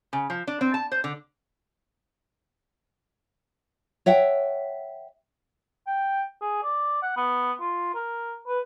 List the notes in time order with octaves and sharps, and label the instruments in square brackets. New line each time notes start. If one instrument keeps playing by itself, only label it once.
[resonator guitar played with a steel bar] C#3
F3
D4
C4
A5
C5
D3
[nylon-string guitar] C#5 E5 F#5 G5
[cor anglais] G5
G#4
D5
F#5
B3
F4
A#4
B4